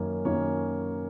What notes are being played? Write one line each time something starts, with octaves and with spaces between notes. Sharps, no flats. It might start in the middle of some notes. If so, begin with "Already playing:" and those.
Already playing: F#2 D#3 A#3 C#4
F#2 D#3 A#3 C#4 C#5